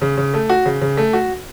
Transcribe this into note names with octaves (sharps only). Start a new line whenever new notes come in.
C#3
C#3
A3
F#4
C#3
C#3
A3
F#4